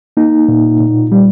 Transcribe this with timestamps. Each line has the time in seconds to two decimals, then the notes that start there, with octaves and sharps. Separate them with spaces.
0.17 A#3 D#4
0.48 A#2
0.80 A#2
1.12 G3